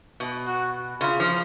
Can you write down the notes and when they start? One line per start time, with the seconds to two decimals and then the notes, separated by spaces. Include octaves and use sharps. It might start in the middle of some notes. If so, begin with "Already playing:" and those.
0.20 B2
0.47 F#4
1.01 C#3 F4
1.20 F3